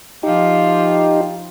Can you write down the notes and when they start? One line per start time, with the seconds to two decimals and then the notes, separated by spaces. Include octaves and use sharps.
0.23 F3 D#4 F4 G4